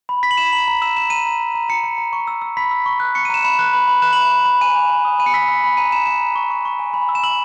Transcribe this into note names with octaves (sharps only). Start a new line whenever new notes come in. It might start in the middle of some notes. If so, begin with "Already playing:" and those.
B5
B5 B6
F#7
B5 E7
A#5 F#7
A#5
E6 E7
A#5 E7
A#5 D#7
A#5
A#5
A#5
A#5 C#7
A#5
A#5
C#6
E6
E6
B5 B6
E6
C#6
F#6
C#6 C#7
D#7
A#5 E7
B5 E7
F#6
B5
B5
F#6 E7
F#7
B5 E7
B5
B5
G#5 D#7
G#5
G#5
D#6
B5 D#7
C#7
E6 B6
C#7
E6
B5
A#5 D#7
A#5 E7
A#5 E7
A#5
C#6
C#6
C#6
G#5
B5
E6
E7
E6 F#7